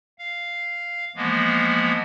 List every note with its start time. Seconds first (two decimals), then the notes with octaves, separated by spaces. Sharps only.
0.19 F5
1.16 E3 F3 G#3 A#3 B3